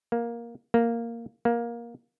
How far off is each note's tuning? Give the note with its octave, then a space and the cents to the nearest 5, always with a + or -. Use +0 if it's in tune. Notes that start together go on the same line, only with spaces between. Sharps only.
A#3 +10
A#3 -5
A#3 +15